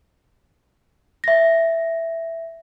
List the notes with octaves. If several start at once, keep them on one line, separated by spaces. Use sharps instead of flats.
E5 A#6